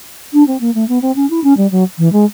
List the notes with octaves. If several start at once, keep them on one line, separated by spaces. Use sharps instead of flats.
D4
C4
A#3
A3
B3
C4
C#4
E4
C#4
G3
F#3
E3
G#3